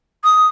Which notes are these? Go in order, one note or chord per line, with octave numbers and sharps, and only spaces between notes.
D#6